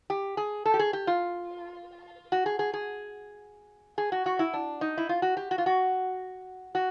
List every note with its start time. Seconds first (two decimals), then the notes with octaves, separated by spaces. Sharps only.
0.10 G4
0.37 G#4
0.65 A4
0.74 G4
0.79 G#4
0.93 G4
1.07 F4
2.32 F#4
2.46 G#4
2.59 G#4
2.73 G#4
3.98 G#4
4.12 F#4
4.26 F#4
4.39 E4
4.54 D4
4.81 D#4
4.97 E4
5.09 F4
5.22 F#4
5.37 G4
5.51 F#4
5.58 F4
5.66 F#4
6.75 F#4